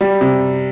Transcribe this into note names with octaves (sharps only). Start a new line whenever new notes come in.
G3
C3